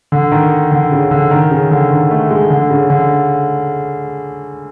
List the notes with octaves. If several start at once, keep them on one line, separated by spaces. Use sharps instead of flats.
D3
D#3
D3
C#3
D3
D#3
C#3
D3
D#3
A3
G#3
D3
C#3
D3